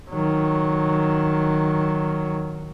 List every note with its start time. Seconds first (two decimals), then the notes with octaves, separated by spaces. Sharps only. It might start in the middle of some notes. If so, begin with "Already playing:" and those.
0.10 D#3 F#3